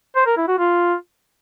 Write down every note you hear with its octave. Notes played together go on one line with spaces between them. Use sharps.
C5
A#4
E4
F#4
F4